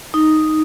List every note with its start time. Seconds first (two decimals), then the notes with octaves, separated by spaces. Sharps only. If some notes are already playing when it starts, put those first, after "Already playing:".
0.14 D#4